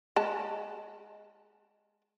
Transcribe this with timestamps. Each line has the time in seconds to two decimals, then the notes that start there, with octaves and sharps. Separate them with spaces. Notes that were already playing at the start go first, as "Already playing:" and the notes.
0.16 G#3 A5